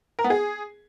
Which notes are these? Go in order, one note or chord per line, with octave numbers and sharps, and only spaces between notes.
A#4
B3
G#4